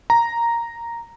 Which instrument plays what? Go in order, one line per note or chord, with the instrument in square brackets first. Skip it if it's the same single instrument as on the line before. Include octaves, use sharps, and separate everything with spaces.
[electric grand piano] A#5